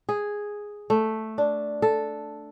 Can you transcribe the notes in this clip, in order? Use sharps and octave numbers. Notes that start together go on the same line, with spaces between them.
G#4
A3
D4
A4